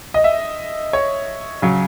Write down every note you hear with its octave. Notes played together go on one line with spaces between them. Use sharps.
D#5
E5
C#5
C#3 F#3